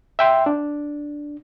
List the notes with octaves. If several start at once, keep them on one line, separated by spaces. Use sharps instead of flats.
E5 G5 C6
D4